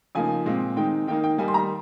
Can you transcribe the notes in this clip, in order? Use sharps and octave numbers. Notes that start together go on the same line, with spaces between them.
C#3 F3 A#3 D#4 G#5
A#2 G#3 C4
D#3 G#3 C4 D#4 G5
D#3 A#3 D#4 G5
G5
D#3 G3 A#3 D#4 G#5
C6
A#5